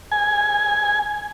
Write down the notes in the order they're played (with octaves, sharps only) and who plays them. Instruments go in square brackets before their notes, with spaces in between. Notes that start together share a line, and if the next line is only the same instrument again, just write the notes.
[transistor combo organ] G#5